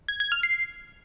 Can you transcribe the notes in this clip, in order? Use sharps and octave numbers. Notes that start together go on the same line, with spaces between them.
G#6
G#6
F6
C7